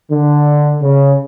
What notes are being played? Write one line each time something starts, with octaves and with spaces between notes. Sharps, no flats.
D3
C#3